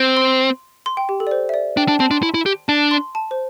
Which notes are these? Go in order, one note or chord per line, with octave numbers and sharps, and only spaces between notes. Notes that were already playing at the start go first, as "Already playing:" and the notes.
Already playing: C4
C6
C6
G5
G4
A4
D5
C5
E5
D5
D4 G5
D4 A5
C4 A5
D4 C6
E4
E4
G4
D4 A5
C6
A5
C5